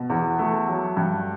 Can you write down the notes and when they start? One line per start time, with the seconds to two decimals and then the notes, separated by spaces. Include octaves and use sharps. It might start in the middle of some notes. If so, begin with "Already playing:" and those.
Already playing: B2
0.10 E2
0.39 A3
0.68 F#3
0.97 G2